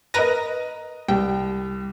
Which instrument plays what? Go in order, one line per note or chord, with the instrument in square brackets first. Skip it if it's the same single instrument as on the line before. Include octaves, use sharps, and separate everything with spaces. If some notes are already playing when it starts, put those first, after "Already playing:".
[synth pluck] A#4 B4 A#6 [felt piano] D#5 A#5 D#7
[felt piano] C2 G4 [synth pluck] G5